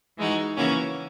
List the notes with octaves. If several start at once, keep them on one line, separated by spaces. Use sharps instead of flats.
E3 G#3 D#4 F#4
C#3 E3 A#3 C#4 F#4